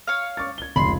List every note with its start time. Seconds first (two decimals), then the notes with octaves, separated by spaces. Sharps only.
0.07 C#5 F5
0.37 C#6 D6 A6
0.58 G#6 G7
0.76 F1 C#2 B5 C6